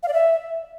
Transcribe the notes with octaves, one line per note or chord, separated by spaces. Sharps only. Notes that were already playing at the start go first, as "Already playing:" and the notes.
F5
D5
E5